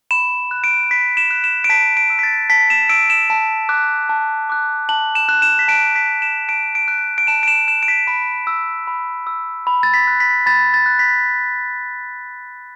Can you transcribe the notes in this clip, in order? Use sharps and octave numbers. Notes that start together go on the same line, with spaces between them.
B5 E7
F#6
D7
B5 B6
E7
F#6
E7
D7
A5 B6
D7
E6
B6
A6
A5 B6
E7
E6 D7
E7
A5
D6 F#6
A5
D6 F#6
A5 F#7
E7
F#6
E7
B6
A5 D7
B6
F#6
E7
A5 D7
D7
F#6
D7
A5 E7
D7
E7
F#6 E7
D7
B6
B5
E6
B5
E6
B5
A6
B6
F#6
B6
B5 A6
A6
F#6
B6